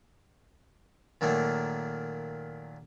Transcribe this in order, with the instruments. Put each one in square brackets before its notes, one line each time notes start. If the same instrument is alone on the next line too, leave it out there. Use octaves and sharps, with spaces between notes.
[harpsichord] A#2 D#3 F#3 A3 A#3